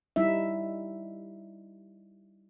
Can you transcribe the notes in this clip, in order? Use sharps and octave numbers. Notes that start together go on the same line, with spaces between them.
G3 D#4 E4 E5